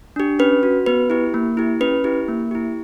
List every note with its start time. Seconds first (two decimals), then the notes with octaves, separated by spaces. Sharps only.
0.16 D4 G4
0.39 C#4 B4
0.63 F#4
0.86 B3 B4
1.10 E4 G4
1.34 A#3
1.57 E4 G4
1.80 C#4 B4
2.04 E4 G4
2.28 A#3
2.51 E4 G4